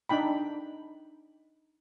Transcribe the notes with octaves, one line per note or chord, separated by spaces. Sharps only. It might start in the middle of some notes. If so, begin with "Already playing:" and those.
D4 D#4 G5 B5